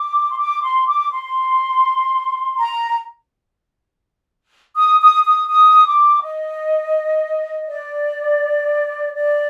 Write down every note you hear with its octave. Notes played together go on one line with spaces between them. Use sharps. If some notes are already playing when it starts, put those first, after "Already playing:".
Already playing: D6
C6
D6
C6
D6
C6
A#5
D#6
D#6
D#6
D#6
D6
D#5
D5
D5